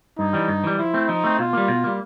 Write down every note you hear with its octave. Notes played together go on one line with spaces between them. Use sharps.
G2 D#4
E3 G3
G2
E3 G3
F3 E4
A3 C4
F3 D#4
A3 C4
B2 F4
G3 A#3
B2
G3 A#3